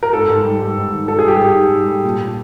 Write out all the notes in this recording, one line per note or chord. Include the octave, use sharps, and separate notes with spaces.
A#4
G#2 A4
G#2
G3
G3
G#2
D#3
G#2 A4
G#4
G3 G4
G#2 G#4
G#2
G3
G3
A#2
A#2